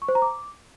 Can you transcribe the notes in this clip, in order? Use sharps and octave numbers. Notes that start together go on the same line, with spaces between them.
C#6
C5
A#5
D6